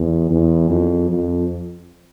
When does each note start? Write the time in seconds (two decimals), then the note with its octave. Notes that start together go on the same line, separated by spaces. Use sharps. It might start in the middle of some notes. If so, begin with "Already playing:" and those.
Already playing: E2
0.31 E2
0.70 F2
1.10 F2